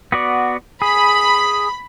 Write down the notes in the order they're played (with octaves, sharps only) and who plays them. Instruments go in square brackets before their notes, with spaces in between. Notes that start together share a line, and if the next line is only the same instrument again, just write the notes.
[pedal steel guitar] B3 F#4 D5
[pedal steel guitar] G#4 [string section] B5